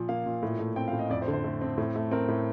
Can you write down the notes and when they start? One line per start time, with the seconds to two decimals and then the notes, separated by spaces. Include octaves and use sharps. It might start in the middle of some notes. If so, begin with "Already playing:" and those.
Already playing: A#2 F3
0.09 A#3 F5
0.26 A#2
0.43 A2
0.59 A3
0.76 C4 G5
0.88 F5
0.93 A2
0.99 D#5
1.10 F2 D5
1.22 C5
1.28 D3
1.33 C5
1.44 A3
1.61 C4
1.77 A2
1.96 A3
2.11 C4 A#4
2.28 A2